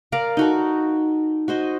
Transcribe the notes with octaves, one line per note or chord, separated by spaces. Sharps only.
A#4 D5 F5 A#5
D#4 F#4 A4
F#4 C5 D#5